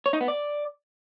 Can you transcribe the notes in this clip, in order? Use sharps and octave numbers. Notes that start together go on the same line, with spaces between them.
C#5
D#4
B3
D5